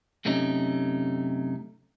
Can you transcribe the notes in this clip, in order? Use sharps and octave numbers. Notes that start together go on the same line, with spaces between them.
F#2 C3 A3 C#4 D#4